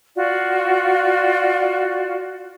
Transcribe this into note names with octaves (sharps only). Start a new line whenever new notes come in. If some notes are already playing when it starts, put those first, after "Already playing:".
F4 F#4 D5